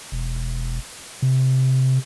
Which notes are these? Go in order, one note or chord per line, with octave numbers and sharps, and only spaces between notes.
E1
C3